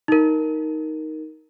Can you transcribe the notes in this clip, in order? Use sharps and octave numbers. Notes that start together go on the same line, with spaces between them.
D#4 A#4